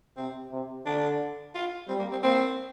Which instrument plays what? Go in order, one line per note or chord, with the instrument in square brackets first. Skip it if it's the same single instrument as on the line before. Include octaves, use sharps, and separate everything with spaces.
[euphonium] C3 [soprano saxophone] C4
[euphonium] C3
[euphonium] D3 [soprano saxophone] D4
[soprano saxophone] F4
[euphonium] G3 [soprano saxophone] C4
[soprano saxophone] A#3
C4
[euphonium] A#3 [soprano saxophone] C4